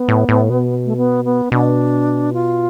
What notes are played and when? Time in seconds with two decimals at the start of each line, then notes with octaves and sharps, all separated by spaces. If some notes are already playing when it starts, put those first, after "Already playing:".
Already playing: B3
0.09 A2
0.29 A2
0.50 B2
0.85 A3
0.97 B3
1.25 B3
1.52 B2 D4
2.33 F4